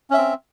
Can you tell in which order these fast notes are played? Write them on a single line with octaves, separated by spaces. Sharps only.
C#4 E5 C4